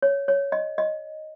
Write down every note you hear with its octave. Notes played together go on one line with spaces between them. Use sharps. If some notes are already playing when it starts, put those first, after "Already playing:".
C#5
C#5
D#5
D#5